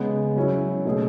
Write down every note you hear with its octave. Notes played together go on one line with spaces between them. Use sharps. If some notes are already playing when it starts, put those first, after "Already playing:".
Already playing: C#3 G#3 B3
F#3 C#4 E4
B2 A3 C#4 G#4